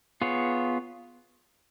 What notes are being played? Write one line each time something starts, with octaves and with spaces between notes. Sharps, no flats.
B3 F4 G#4 C#5